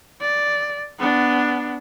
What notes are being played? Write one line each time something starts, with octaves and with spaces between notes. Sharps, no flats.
D5
B3 D4